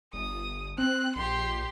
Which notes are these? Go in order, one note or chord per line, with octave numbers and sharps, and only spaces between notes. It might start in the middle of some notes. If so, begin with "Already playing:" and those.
G1 D#6
C4 F#6
A#1 G4 C6